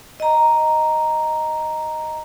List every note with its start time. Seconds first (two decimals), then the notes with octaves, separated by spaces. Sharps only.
0.20 D#5 A#5